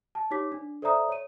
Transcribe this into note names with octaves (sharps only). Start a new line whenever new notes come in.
A5
D#4 G4 C#5 D6 B6
D4
A4 C5 D5 E5 A#5 D#6
C#5 D#7